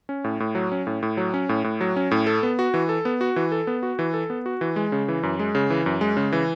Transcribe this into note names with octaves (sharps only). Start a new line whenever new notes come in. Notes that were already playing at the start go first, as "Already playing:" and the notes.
C#4
A2
A2
F#3
C#4
A2
A2
F#3
C#4
A2
A2
F#3
C#4
A2
A4
B3
F#4
E3
A4
B3
F#4
E3
A4
B3
F#4
E3
A4
B3
F#4
E3
G#3
C#3
E3
F#2
G#3
C#3
E3
F#2
G#3
C#3
E3